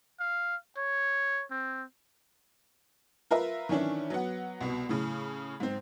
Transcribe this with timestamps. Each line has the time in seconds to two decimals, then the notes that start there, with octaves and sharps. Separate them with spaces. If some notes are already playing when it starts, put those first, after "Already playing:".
0.19 F5
0.77 C#5
1.50 C4
3.31 F4 A#4 B4 E5
3.69 D#3 E3 C#4 D4 E4
4.10 F#3 B3 F#5
4.61 C2 B2
4.89 A2 C#3
5.60 G#2 C4